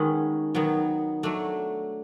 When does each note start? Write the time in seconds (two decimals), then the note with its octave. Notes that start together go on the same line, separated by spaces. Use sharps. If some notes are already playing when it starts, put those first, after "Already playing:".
Already playing: D#3 G#3 C#4 F#4 B4
0.55 D#3 F#3 B3
1.23 F#3 A3 D4